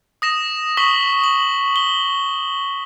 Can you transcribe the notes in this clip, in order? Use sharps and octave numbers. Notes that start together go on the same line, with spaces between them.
D#6 A#6 E7
C#6 D#6 B6 F#7 G7
F#7
G7